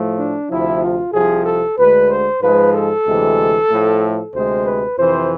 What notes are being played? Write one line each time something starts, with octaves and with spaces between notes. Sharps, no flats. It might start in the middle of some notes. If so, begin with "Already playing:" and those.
Already playing: A2 F3 A3
D4
D2 C3 F3 E4
F4
C2 C3 F3 G#4
A4
D2 D3 G#3 B4
C5
G#2 F3 G#3 B4
A4
D2 C3 E3 G#3
A2 F3 A3
D2 C3 G#3 C5
B4
F2 C3 E3 C5